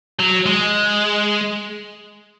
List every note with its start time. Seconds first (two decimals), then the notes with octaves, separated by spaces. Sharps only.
0.19 F#3
0.46 G#3